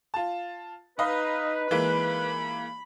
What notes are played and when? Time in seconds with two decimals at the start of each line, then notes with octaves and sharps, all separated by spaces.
0.14 F4 A5
0.99 D#4 B4 D#5 F5 B5
1.71 E3 G#3 A#3 B5